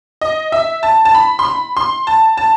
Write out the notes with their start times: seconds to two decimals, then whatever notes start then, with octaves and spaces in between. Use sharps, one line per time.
0.21 D#5
0.52 E5
0.83 A5
1.05 A5
1.15 B5
1.39 C6
1.45 B5
1.77 C6
2.07 A5
2.37 A5